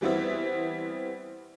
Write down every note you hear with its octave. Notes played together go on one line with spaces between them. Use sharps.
E3 G3 B3 C4 E4